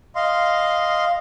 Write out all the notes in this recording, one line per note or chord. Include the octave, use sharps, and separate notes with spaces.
D#5 F5 C6